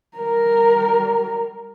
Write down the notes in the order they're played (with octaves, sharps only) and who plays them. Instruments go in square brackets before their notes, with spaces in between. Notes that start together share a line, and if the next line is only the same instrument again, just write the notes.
[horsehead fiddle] G3 A#4